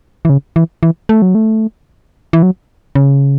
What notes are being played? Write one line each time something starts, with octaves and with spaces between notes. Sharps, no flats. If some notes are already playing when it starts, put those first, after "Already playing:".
E3
C#3
E3
E3
A3
F#3
A3
E3
F#3
C#3